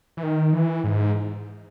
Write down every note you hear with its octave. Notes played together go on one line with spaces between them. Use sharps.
E3
D#3
E3
G#2